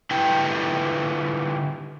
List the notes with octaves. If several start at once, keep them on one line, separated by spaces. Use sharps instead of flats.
D3 E4 G4 B4 G5